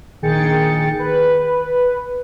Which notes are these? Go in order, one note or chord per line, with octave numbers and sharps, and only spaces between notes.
A#1 D#3 G#4 G5 A6 C#7
B4